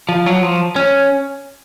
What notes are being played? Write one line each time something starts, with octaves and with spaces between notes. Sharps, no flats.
F3
F#3
F3
C#4